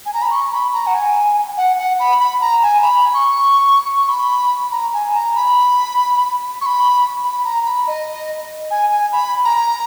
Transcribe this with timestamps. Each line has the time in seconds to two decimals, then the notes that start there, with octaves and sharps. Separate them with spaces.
0.06 G#5
0.14 A#5
0.22 B5
0.31 C#6
0.52 B5
0.73 A#5
0.87 F#5
0.94 G#5
1.58 F#5
1.78 F#5
2.00 B5
2.19 B5
2.41 A#5
2.63 G#5
2.82 B5
3.14 C#6
3.97 C#6
4.09 B5
4.72 A#5
4.93 G#5
5.15 A#5
5.35 B5
6.61 C#6
6.66 B5
7.24 B5
7.44 A#5
7.65 B5
7.87 D#5
8.71 G#5
8.92 G#5
9.12 B5
9.45 A#5